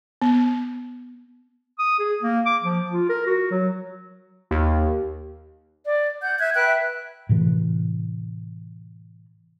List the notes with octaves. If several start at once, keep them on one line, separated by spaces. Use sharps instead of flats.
B3
D#6
G#4
A#3
D6
F3
F4
A#4
F#4
F#3
D#2
D5
F#5 G6
E5 F#6 G#6
B4 E5 G5 F#6
A2 C3 E3